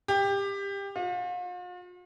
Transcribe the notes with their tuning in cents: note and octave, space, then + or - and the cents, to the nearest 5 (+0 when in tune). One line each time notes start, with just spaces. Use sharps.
G4 +20
F4 +45